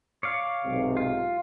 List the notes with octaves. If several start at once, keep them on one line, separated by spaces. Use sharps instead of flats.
C#5 D5 F5
B1 G#2 C3
F4